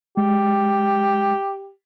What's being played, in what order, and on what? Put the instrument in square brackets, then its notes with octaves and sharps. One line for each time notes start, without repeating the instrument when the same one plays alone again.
[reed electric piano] G#3 [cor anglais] G4